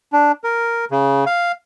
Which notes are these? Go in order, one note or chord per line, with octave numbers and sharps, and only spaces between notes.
D4
A#4
C#3
F5